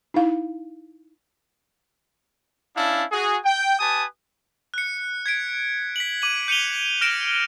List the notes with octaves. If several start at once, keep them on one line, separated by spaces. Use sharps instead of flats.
D#4 E4 F5
C#4 D4 E4 F5 A5
F#4 G#4
G5
G4 B4 G#5 A5 D#6
F#6 C#7
G#6 B6 D7
B6 F#7
D6 D#7 F#7
G6 C#7 D#7 F7 G7
F6 A#6 D7 E7